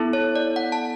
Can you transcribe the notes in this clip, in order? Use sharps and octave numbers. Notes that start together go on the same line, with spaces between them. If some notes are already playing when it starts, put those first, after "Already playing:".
Already playing: B3 E4 A4
C#5
D5
F#5
A5